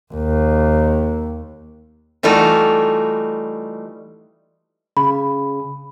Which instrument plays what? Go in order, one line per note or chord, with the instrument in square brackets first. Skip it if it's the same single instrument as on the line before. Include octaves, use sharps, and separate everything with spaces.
[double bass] D#2
[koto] E3 G3 A3 D#4 F4 F#4
[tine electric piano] C#3 [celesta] B5